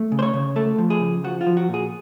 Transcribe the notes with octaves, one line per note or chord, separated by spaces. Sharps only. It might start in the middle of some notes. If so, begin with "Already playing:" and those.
Already playing: A3
C#3
C5
C#5
C#3
A3 A4
F3
G#4
C#3
F3 F#4
F4
F3
F#4
A#2
G#4